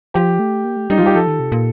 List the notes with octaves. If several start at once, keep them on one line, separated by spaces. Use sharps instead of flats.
F3 G4
A3
A#3
A3
G3 D#4
F3 F4
G3 G4
F3 A4
D#3
C3
A#2